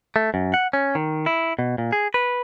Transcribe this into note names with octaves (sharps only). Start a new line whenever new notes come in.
A3
F#2
F#5
C#4
D#3
E4
B2
A#2
G#4
B4